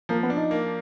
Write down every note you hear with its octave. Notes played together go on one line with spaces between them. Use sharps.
F3 A#3
B3
D4
D#4
A#3